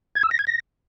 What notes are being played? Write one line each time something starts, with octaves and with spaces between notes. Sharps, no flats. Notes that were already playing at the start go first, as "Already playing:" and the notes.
G#6
E6
A#6
G#6
A#6